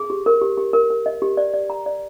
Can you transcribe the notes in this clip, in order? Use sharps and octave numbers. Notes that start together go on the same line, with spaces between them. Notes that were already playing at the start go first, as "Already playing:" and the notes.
Already playing: G#4
G4
A#4
G4
G4
A#4
A#4
D#5
G4
D5
D5
A#5
D5